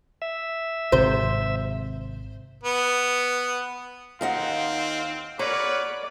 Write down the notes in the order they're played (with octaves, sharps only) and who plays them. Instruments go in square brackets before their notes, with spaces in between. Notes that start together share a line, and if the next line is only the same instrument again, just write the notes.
[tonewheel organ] E5
[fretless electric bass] G#1 C3 [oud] C5
[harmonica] B3
[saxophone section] D#2 F4 F5 [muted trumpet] C4 [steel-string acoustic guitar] D#4 D#5 F#5
[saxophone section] F#4 A#4 C#5 [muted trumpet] B4 [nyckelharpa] D5 [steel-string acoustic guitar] A#5